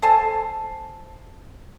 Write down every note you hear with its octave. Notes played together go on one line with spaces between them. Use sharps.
A4 C5 G#5 A5